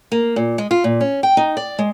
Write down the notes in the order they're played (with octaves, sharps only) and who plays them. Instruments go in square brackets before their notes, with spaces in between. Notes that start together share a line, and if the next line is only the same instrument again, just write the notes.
[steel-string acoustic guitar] A#3
A#2
G#3
F4
A#2
C#4
G5
D#4
D5
G#3